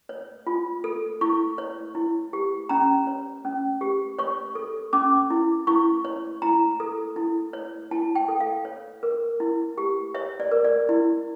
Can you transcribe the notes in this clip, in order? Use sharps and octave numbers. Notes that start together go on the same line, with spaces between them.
C#5
F4
A4
E4 C#6
C#5
E4
G4
C#4 A#5
C#5
C#4
G4
C#5 C#6
A4
C#4 D6
E4
E4 C#6
C#5
E4 A#5
A4
E4
C#5
E4 A5
G5
A4
F5
C#5
A#4
E4
G4
C#5 E5
D5
A#4
D5
E4